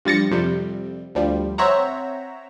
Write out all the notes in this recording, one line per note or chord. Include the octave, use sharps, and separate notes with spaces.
G2 F3 G3 A6 A#6 C#7
F2 C3 G3
D2 F3 G3
C4 C#5 E5 F#5 A#5